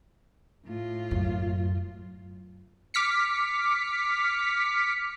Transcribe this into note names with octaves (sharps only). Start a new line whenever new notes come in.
A2 F4
F#2
D6 F6 B6 C#7